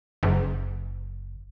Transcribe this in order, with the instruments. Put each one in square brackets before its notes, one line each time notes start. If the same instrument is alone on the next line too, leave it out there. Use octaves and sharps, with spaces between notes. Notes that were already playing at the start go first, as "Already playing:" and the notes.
[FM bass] F#1